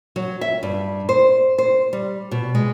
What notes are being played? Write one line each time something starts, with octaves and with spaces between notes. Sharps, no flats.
F#3
E5
G2
C5
C5
G3
B2
G#3